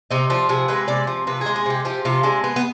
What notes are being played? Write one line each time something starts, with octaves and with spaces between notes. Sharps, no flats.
C3 D#4
F3 D4
C3 G#4
G#3 B4
C3 D5
F3
C3 B4
G#3 G#4
G#4
C3 G4
F3 G4
C3 F4
G#3 D4
B3
B3